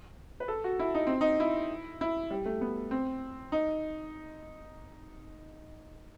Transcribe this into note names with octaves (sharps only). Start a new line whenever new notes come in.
B4
A4
F#4
E4
D#4
C4
D#4
E4
E4
G3
A3
B3
C4
D#4